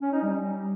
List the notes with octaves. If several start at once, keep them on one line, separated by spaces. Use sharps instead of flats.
C#4
D#4
G3